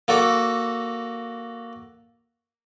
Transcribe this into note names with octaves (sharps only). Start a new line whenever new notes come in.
A#3 F#4 A4 D5